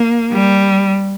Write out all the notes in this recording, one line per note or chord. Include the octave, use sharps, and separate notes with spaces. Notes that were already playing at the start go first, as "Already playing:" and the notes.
Already playing: A#3
G3